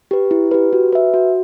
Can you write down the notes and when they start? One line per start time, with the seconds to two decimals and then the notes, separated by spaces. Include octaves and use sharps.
0.11 G4 B4
0.31 E4
0.51 G4 B4
0.73 F#4
0.93 B4 E5
1.14 F#4